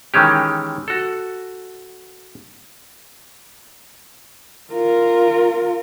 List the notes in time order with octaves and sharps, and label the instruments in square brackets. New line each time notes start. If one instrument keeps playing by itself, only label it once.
[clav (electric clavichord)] D#3 E3 G#3 C#4 G4
F#4 A4
[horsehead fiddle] F4 A#4